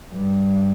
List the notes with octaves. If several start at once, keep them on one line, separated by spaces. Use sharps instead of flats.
G2